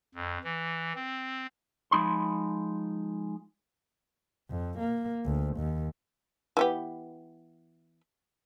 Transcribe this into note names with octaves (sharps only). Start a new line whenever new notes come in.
F2
E3
C4
F3 G#3 D#4 B5 C6
F2
A#3
D2
D#2
E3 B3 G4